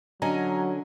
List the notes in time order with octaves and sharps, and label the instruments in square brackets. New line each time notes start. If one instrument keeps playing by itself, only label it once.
[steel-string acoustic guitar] D3 C#4 [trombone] F#3 [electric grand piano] D#5 G#5 A#5